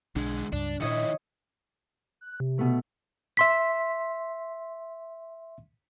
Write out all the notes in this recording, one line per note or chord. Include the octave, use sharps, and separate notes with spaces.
B1 D3 G#3 D4
C#2 G2 D4
A#2 D#3 D4 E4 C#5 D#5 C#7
F#6
C3
B2 A3
E5 C6 B6